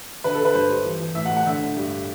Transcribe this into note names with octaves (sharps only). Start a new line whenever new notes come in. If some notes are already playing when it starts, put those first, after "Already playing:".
D3 B4
A4
D3
B4
G2 C5
G2
E3
E3
A2 E5
F#5
A2
F#5
D3 E5
D3
G2